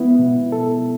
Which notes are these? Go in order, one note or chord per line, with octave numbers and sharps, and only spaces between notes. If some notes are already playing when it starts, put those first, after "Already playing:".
Already playing: B3 E4
B2
A4